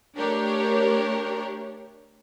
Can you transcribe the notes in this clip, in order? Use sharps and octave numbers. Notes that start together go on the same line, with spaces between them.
A3 D4 G4 A#4 C#5